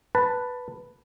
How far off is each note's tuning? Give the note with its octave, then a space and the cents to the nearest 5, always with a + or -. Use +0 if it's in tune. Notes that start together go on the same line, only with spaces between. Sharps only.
B4 +0 A5 +15